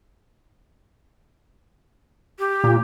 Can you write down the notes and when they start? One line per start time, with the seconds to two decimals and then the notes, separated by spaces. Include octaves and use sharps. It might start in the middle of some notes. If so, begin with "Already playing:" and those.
2.39 G4
2.64 A#2